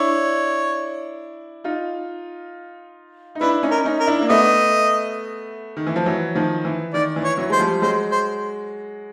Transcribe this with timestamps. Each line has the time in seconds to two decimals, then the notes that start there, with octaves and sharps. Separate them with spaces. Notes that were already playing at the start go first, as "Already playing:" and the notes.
Already playing: D4 E4 C#5
1.64 D#4 F4
3.35 D#4
3.41 D4 E4 B4
3.63 C#4 D#4
3.71 A#4
3.85 C#4 D#4
4.00 A#4
4.07 D4 E4
4.21 A#3
4.29 A3 B3 D#5
5.77 D#3
5.87 E3
5.96 F3
6.06 E3 F#3
6.35 D#3 F3
6.65 E3
6.93 D#3 D5
7.16 E3
7.24 C#5
7.37 E3 F#3
7.49 G#3 C5
7.60 F3 G3
7.82 F#3 G#3 C5
8.11 C5